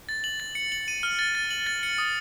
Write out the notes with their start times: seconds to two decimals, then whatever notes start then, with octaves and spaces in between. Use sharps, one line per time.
0.09 A6
0.24 F#7
0.40 A6
0.55 C#7
0.72 F#7
0.88 D#7
1.03 F6
1.19 A6
1.35 A6
1.51 F#7
1.67 A6
1.83 C#7
1.98 D#6